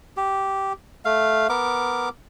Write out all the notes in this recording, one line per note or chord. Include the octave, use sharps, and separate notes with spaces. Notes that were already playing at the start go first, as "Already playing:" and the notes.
G4
A3 F5
B3 A#4 D6